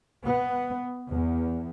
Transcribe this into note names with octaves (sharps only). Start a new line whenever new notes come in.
B3
E2